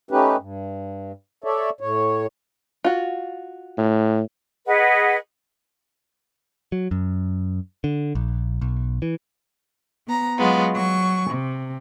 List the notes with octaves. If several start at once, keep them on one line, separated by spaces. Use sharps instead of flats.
A3 C#4 D#4 G4 B4
G2
A4 C#5 D5 E5
A2 C#5
F4 F#4
A2
G#4 B4 D#5 F#5
F#3
F#2
D3
A#1
B1
E3
B3 A#5
F#3 G#3 B3 F4
F#3 C#6
C3